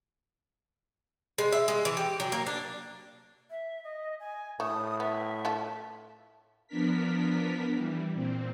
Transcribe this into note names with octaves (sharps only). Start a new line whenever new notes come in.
G#3
E5
G#3
E3
G4
F#3
A#3
D4
E5
D#5
G#5
A2 A3 D#6
B3 E5
A3 F4 A4
F3 B3 D4 A#4 B6
E3 G3
A#2 C4